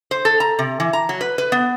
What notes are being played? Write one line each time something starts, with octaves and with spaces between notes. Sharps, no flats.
C5
A4
A#5
C3
E3
A#5
F#3
B4
B4
B3